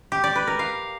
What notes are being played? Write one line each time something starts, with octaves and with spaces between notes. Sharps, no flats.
G4
D5
B4
A#4
F5